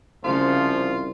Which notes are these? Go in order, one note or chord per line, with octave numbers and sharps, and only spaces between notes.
C2 C#3 F3 F4